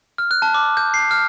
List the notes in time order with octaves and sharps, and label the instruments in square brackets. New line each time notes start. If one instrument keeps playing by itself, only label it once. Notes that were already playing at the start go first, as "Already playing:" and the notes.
[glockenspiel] F6
F#6
A5
D6
G6
C7
F6